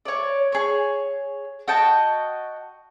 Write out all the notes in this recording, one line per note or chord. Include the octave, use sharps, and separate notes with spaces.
C#5 D5
G#4 C#5
F#4 D#5 G5 A5